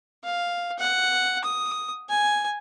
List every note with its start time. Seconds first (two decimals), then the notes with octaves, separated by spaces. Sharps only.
0.24 F5
0.78 F#5
1.44 D#6
2.09 G#5